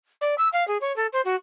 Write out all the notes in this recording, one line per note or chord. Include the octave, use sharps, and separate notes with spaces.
D5
E6
F5
G#4
C#5
A4
C5
F#4